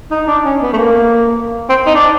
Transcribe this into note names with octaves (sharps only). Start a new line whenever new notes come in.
D#4
D4
C#4
B3
A3
A#3
C4
D#4
D4